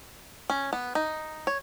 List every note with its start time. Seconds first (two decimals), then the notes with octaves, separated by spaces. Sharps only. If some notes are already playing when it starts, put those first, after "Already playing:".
0.50 C#4
0.73 B3
0.95 D#4
1.47 C#5